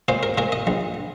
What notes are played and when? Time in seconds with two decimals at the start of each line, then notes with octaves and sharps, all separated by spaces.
0.08 A#2 C5
0.23 A#4
0.38 A#2 A#4
0.52 D#5
0.67 A#1